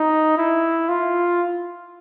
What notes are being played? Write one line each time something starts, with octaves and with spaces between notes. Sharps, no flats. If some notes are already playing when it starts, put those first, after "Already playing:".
Already playing: D#4
E4
F4